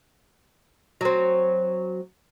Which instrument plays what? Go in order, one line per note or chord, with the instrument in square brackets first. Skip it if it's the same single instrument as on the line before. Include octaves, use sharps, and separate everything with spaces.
[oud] F#3 C4